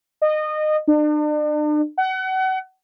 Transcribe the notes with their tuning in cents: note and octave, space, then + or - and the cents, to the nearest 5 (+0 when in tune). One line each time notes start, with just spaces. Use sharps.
D#5 -25
D4 +40
F#5 +30